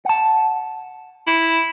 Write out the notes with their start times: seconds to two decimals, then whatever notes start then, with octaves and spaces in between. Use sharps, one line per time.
0.05 F#5 A5
1.27 E4